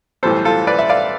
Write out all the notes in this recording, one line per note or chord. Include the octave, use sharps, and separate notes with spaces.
B1 A2 E3 G3 B3 A4 C5
F4 A4
B4 D5
E5
D5 F5